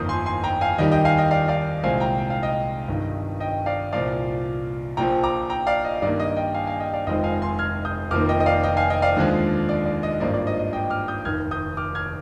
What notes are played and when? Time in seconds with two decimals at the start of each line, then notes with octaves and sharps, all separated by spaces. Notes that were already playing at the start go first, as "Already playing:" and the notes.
Already playing: G1 F2 D#3 A#3 D#6 G6
0.09 G#5 C6
0.26 G#5 C6
0.44 G5 A#5
0.61 F5 G#5
0.78 D#2 D#3 G3 D#5 G5
0.91 D#5 G5
1.05 F5 G#5
1.18 D#5 G5
1.31 D5 F5
1.48 D5 F5
1.83 C2 A#2 G#3 C4 F5 G#5
2.00 G5 A#5
2.18 G5
2.30 F5
2.43 D#5 G5
2.88 G1 G2 D#3
3.40 D#5 G5
3.66 D5 F5
3.93 C2 A#2 F3 D5 F5
4.97 A#1 A#2 F3 G5 A#5
5.23 A#5 D6
5.50 G5 A#5
5.67 D5 F5
5.85 D#5
6.02 G2 D#3 A#3 D5
6.20 D#5
6.36 D#5 G5
6.54 F5 G#5
6.67 F5 G#5
6.80 D#5 G5
6.94 D5 F5
7.06 F1 F2 D#3 G#3 C4 D#5 G5
7.24 F5 G#5
7.42 G#5 C6
7.59 F6 G#6
7.85 D#6 G6
8.11 F1 F2 D#3 A#3 D6 F6
8.29 D#5 G5
8.40 D#5
8.46 D5 F5
8.63 D#5 G5
8.77 F5 G#5
8.90 D#5 G5
9.02 D5 F5
9.16 D#2 D3 F3 G#3
9.69 D5
9.85 D5
10.03 D#5
10.20 G#1 G2 F3 A#3 D5
10.34 D5
10.47 D#5
10.59 D#5
10.73 D#5 G5
10.90 D6 F6
11.08 D#6 G6
11.25 F1 D#2 D#3 F6 G#6
11.51 D#6 G6
11.77 D6 F6
11.95 F6 G#6